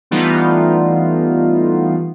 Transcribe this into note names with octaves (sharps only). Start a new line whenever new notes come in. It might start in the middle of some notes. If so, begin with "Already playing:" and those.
E3 G3 A3 B3 D#4 F4